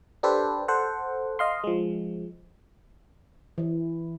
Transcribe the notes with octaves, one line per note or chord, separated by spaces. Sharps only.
D4 G4 A4 B4 C5
A4 C5 F#5
D#5 F5 C6
F3 G#3
E3